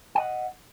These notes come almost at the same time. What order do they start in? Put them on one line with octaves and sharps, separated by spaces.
G5 D#5 F#5